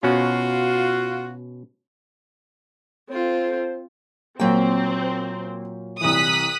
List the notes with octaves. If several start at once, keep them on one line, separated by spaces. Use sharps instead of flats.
B2 C#4 F4 F#4
C4 F4 A4 C5
A#2 F#3 A#3 C4 G5
C2 E3 D#6 F#6 B6